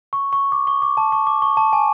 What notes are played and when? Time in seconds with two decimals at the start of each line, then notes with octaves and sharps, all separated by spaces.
0.13 C#6
0.33 C#6
0.52 D6
0.67 C#6
0.82 D6
0.97 A5
1.12 C#6
1.27 D6
1.42 C#6
1.57 A5
1.73 G#5